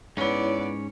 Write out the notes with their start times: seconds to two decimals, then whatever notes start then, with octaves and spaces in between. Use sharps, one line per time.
0.17 G#2 B3 C#4 E4 C#5 D5